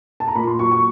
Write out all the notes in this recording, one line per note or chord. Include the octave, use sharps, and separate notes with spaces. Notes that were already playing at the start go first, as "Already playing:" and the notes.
A5
A#5
A#2 B5
C6
F#3 C#6
C#6